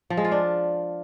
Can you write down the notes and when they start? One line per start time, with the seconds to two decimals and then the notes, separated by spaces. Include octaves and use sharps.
0.10 F3
0.17 G#3
0.24 F4
0.31 D4